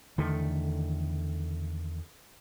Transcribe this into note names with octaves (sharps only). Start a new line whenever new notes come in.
E2 D3 D#3 A3